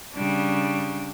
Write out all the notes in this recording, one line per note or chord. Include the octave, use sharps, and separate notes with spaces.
C#3 G3 D4